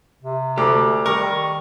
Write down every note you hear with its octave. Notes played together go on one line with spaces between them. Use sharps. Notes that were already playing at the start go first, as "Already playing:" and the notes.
C3
D2 G4 A4
D#3 G3 A#4 C#6